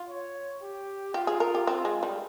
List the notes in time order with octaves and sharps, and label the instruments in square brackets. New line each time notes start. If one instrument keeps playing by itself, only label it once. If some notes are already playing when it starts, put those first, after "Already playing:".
Already playing: [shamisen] F4
[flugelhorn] C#5
G4
[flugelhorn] F4 [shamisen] G4
[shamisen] G#4
A#4
G4
C4
G#3
G3